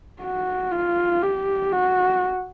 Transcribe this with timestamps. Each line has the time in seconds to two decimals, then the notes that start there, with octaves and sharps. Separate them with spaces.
0.21 F#4
0.72 F4
1.23 G4
1.72 F#4